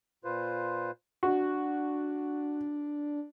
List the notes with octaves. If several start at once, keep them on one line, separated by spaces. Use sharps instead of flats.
A#2 F4 B4 C5
D4 F#4